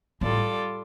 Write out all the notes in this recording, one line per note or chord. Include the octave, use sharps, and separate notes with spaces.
A2 G3 F4 A4 D5